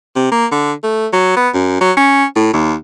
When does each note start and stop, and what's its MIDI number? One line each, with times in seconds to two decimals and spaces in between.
0.16 0.31 48
0.32 0.46 58
0.52 0.72 50
0.84 1.07 57
1.13 1.35 54
1.36 1.49 59
1.54 1.77 42
1.81 1.92 54
1.97 2.24 61
2.36 2.52 45
2.54 2.75 39